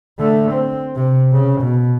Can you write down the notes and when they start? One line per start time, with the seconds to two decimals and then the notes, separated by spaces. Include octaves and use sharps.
0.19 D3 A3
0.53 C4
0.95 C3
1.32 C#3
1.61 B2